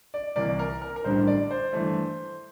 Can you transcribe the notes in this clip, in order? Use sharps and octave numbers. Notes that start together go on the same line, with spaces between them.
D5
C2 C3 E3 A#3 D5
A#4
A#4
A#4
A1 G2 D3 G3 C5
D5
C5
G2 E3 A3